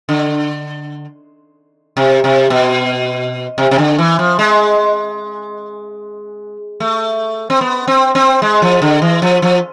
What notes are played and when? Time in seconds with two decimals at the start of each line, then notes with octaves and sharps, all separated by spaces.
0.09 D3
1.97 C3
2.24 C3
2.50 B2
3.58 C3
3.71 C3
3.78 D3
3.98 E3
4.19 F3
4.39 G#3
6.80 A3
7.50 C4
7.61 B3
7.87 C4
8.15 C4
8.42 G#3
8.62 F3
8.82 D3
9.02 E3
9.22 F3
9.42 F3